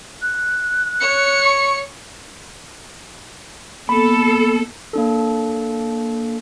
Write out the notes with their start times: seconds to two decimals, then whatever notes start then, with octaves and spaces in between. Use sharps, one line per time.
0.22 F#6
1.00 C#5 C#7
1.44 C#6
3.89 A#3 B3 A4 B5
4.93 A#3 D4 A4